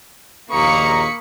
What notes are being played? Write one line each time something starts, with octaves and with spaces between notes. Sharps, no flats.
A#1 D#2 A#3 A#5 B5 C#6 D#6 C#7